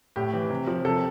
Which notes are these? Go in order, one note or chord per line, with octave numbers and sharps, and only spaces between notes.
A2 G4
E3
C3
F3
C3 A4